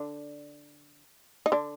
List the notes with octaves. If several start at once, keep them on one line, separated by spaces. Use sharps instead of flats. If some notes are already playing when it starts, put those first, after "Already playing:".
Already playing: D3 D4
D#4
D3 D4